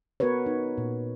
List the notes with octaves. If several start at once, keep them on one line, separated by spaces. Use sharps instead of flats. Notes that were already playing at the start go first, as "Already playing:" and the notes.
B3 F#4 A#4 B4 C#5
D#4
A#2